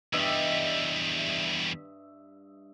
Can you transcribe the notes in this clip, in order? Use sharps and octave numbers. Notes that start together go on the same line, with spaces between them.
E2 G2 G3 D#5 E5